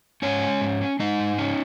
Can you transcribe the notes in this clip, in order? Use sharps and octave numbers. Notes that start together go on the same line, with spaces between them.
G#2 C#4 C#5
G#3
G#2
C#4
G#3 D#4 D#5
G#2
C#4